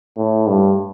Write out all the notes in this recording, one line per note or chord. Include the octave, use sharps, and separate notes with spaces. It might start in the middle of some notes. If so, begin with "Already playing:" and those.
A2
G2